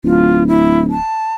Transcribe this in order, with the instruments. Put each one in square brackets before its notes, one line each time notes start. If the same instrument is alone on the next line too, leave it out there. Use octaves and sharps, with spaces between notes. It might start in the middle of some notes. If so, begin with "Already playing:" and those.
[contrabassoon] D1 [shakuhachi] F4
[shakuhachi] E4
A5